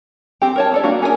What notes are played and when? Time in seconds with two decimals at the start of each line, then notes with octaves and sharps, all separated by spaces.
0.42 C4 G4
0.56 A#4 C#5 A5
0.72 B3 A4 D5
0.84 A#3 D4 D#4 F#4
1.02 C#4 G#4 A#4 C5 G#5